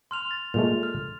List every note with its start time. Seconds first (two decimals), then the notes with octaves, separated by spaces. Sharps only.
0.11 C6 F6 F7
0.31 A6
0.54 A#2 G#3 A3 F7
0.83 F6